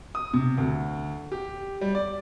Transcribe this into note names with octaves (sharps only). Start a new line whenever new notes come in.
D#6
C3
D2
G4
G3
D5